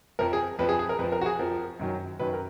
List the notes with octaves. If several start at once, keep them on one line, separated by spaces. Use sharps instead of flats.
F2 F3 A#4
G#4
F2 F3 B4
G#4
G#4
A#4
F2 F3 B4
A#4
F#4
G#4
F2 F3 A#4
F#2 D#3 F#3
F#2 D#3 F#3 B4
A#4